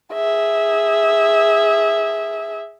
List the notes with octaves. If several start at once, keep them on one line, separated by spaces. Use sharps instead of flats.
G#4 E5